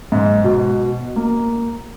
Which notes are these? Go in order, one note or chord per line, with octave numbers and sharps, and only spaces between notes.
G#2
B2
A#3